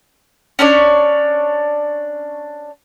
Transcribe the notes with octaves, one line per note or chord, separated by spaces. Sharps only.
C#4 D4 C#5 D5